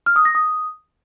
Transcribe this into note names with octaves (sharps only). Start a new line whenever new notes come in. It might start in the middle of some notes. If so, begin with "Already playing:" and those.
F6
D#6
A#6
D#6